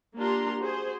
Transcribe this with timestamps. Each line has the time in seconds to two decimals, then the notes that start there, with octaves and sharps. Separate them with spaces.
0.16 A#3 D4 F4 G4 A#5 C6
0.60 F#4 G#4 C5